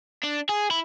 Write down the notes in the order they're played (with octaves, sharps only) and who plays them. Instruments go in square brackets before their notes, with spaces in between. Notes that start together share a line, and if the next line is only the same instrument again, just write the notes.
[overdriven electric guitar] D4
G#4
E4